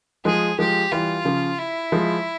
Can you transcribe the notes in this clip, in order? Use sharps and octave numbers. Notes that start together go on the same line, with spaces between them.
F3 G#3 G#4
F3 G#3 G4
E3 G3 F4
C#3 F3
E4
F3 G#3